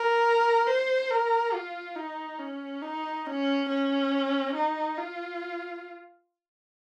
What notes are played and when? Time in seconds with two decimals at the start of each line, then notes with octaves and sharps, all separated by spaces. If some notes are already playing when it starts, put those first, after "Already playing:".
Already playing: A#4
0.67 C5
1.10 A#4
1.53 F4
1.96 D#4
2.39 C#4
2.82 D#4
3.26 C#4
3.69 C#4
4.55 D#4
4.97 F4